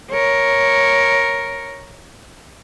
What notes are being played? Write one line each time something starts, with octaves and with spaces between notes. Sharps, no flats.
A#4 C#5